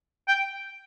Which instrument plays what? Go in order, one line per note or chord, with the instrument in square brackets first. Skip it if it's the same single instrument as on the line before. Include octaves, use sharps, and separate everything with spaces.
[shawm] G5